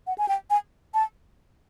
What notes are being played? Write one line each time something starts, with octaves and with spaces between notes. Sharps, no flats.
F#5
G#5
G5
G#5
A5